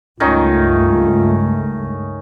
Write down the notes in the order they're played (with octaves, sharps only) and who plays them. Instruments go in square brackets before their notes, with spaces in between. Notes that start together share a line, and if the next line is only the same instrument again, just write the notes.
[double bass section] C#2 G2 A3 [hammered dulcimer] D#3 C#4 D#4 [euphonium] F4